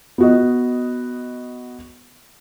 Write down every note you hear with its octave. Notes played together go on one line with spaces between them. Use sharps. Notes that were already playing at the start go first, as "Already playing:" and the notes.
B3 F#4 D#5